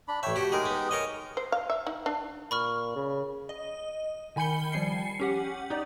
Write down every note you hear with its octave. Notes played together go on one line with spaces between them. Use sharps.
D4 B5
A1 C#5 E5 G5
F#4 G4
G#3 D#4 G4 G#4 A#4
B3
A#4 C#5 D#5
C5
F5
E5
D#4
D4
A#2 B5 C#6 F6
C#3
D#5
D#3 G#5 B5 G6 C#7 G7
F3 G3 G#5 C7 C#7
C#4 G4 F#5
D#4 G4 D5